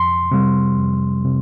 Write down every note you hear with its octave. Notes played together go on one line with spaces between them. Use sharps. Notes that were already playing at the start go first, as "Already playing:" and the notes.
Already playing: F2 C6
C3 G3
F2
C3